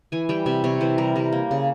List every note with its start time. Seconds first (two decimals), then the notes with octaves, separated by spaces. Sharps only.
0.12 E3 G#5
0.29 G3 G5
0.46 C3 E5
0.64 C3 C#5
0.80 E3 C5
0.98 G3 A#4
1.16 G3 A#4
1.32 A#3
1.51 C#3